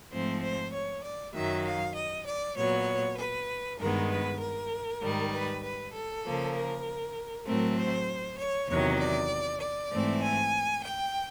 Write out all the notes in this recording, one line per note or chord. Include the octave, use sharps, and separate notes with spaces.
G#2 F3 A3 C4 C5
C5
C#5
D5
F#2 D#3 F#3 E5
F5
D#5
D5
A#2 F#3 B3 C#5
B4
G2 D#3 G#3 B3 A#4
B4
A#4
G#2 D#3 G3
B4
B4
A4
C#3 F3 A#3
A#4
A2 F#3 A3 C4 A#4
C5
C#5
E2 C3 D#3 F#3 C#5
D5
D5
G#2 E3 A3 C4
G#5
G5